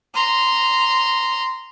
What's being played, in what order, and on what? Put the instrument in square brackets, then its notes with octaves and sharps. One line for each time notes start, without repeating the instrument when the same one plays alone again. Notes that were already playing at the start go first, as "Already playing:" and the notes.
[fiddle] A#5 C6